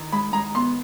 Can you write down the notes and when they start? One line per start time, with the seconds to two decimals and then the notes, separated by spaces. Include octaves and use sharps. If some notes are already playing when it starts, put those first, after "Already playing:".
Already playing: D#3 E4
0.12 G#3 B5
0.33 G#3 A#5
0.55 B3 C6